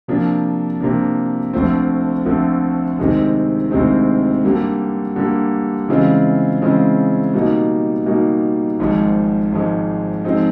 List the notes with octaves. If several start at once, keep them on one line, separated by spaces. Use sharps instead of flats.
C3 F3 A#3 D4
C3 F3 A#3 D4
D2 D3 F3 A3 C4
D2 D3 F3 A3 C4
D2 C3 D#3 G#3 C4
D2 C3 D#3 G#3 C4
D3 G3 A#3
D3 G3 A#3
C#3 E3 G#3 C4 F4
C#3 E3 G#3 C4 F4
B2 G3 A#3 D#4
B2 G3 A#3 D#4
G#1 G#2 F3 G#3
G#1 G#2 F3 G#3
F3 G#3 C4 D#4